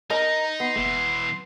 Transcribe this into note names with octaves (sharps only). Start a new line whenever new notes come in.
D#4 A#4 D#5 A#5
B3 C6
F#1 B2 E3